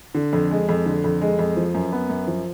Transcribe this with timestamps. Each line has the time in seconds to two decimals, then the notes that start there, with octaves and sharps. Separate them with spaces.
0.14 D3
0.33 F2
0.51 G#3
0.69 F2
0.86 D3
1.04 F2
1.22 G#3
1.39 F2
1.57 F3
1.75 F#2
1.92 B3
2.10 F#2
2.27 F3